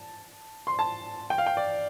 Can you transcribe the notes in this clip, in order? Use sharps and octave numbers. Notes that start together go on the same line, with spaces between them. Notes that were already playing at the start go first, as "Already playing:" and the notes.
Already playing: A5
C6
A5
G5
F5
G5
D5